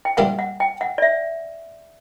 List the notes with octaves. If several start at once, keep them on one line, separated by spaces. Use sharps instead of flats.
G5
A#1 A#2 G3 A#3 E4 F#5
F#5
G5
F#5
D5
E5